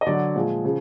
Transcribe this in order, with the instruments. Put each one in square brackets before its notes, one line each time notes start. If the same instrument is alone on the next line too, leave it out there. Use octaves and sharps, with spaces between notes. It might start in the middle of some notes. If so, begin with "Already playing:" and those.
[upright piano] D#5
D3 F#3 D5
A#2 F3 G#3
C#3 F3